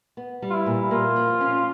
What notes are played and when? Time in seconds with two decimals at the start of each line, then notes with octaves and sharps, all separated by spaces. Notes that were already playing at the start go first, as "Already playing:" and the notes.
0.17 B3
0.42 G3
0.50 F4
0.54 E4
0.66 A#2
0.90 A#3 F4
1.16 F3
1.41 C#4